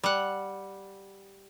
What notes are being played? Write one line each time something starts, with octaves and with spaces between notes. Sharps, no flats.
G3 F#5